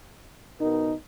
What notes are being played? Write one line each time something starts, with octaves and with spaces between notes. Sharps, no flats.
B2 D#4 A#4